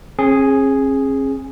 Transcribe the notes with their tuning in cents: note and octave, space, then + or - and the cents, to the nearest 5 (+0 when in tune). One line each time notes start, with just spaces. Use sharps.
C#4 -45 G#4 +0